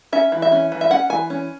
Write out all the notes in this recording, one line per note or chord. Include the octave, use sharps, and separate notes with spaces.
C#4 E5
E3
E5
C#4
E3
E5
C#4 F#5
E3 G#5
C#4